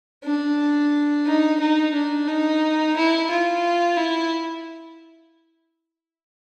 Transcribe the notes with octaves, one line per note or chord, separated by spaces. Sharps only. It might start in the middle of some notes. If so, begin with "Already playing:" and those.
D4
D#4
D#4
D4
D#4
E4
F4
E4